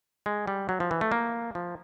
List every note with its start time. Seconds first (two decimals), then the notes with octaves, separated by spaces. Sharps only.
0.26 G#3
0.47 G3
0.69 F#3
0.80 F3
0.91 E3
1.01 A3
1.12 A#3
1.55 F3